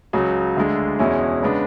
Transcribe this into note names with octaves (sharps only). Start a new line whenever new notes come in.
C#2 C#3 F#3
D2 D3 G#3 D4
E2 B2 G#3 C#4 E4
C#3 G#3 B3 D4